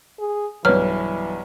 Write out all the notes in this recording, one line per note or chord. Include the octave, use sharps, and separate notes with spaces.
G#4
B1 G2 E3 B4 C#5 F6